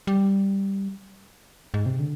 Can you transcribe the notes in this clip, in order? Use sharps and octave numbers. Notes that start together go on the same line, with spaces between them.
G3
G#2
C3
D3